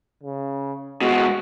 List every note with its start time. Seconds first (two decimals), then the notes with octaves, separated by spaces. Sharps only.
0.23 C#3
1.01 B2 G#3 F#4